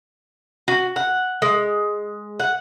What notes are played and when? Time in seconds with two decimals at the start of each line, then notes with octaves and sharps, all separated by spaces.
0.68 F#4
0.96 F#5
1.42 G#3
2.40 F#5